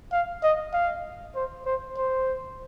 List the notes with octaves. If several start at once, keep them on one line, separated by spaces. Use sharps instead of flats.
F5
D#5
F5
C5
C5
C5